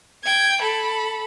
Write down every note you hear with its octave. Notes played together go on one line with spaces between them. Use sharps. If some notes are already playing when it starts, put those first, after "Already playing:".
G5 G#6
A4 B5